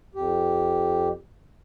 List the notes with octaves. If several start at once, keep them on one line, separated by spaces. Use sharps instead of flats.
F2 G4